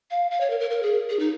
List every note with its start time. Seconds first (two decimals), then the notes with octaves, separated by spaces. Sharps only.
0.11 F5
0.31 F5
0.41 C#5
0.50 A#4
0.60 A#4
0.71 A#4
0.83 G#4
1.10 G#4
1.19 D#4